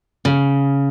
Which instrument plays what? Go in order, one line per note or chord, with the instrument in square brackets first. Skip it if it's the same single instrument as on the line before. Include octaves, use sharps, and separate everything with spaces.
[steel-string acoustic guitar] C#3